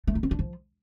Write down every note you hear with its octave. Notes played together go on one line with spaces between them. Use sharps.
A3
D#4
C4
D4
F3